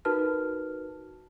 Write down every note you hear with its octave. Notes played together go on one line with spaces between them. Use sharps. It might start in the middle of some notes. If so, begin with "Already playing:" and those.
D#4 F#4 A#4 B4 A5 F6